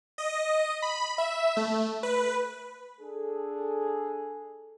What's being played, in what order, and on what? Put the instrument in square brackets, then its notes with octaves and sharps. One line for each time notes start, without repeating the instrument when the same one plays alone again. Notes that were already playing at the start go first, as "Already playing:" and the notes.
[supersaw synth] D#5
B5
E5
A3
B4
[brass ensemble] D4 G#4 A4